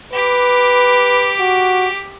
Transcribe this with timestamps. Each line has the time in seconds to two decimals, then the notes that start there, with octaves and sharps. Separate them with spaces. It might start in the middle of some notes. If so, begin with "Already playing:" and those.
0.13 G4 B4 D6
1.40 F#4